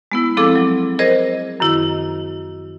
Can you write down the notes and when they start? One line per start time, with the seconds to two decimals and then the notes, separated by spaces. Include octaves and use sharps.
0.12 G#3 B3 E4
0.37 F3 C4 E4 G#4 A4 D6
0.56 F#3
0.99 G#4 A#4 C5 D#5
1.60 F#2 D#3 E4